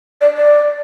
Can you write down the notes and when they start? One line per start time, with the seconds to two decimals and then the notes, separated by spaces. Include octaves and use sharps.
0.21 D5
0.36 D5